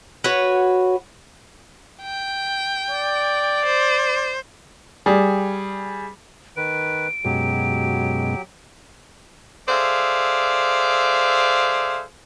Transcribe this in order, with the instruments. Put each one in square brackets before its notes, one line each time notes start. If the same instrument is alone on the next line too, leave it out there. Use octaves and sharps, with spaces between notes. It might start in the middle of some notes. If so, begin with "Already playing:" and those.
[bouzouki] F#4 B4 C#5
[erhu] G5
[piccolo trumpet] D5
[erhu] C5
[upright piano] G3 G#4
[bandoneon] D#3 B4 [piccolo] D7
[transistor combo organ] F#2 B2 G#3 [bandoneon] F#3 G4
[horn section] G#4 A4 C5 D5 E5 F5